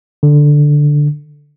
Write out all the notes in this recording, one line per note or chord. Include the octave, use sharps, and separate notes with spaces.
D3